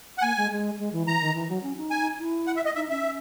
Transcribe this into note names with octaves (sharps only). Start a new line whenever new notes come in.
F#5
A#3 G#5
G#3
G#3
G#3
E3
E3 A#5
D#3
E3
F#3
C#4
D#4
G#5
E4
F#5
E5
D#5
D#4 E5
C#4 E5